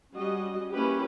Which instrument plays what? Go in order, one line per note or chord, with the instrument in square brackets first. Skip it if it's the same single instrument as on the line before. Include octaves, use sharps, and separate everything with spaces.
[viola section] G3 C#4 F#4 D#5
A#3 C#4 E4 G4 B4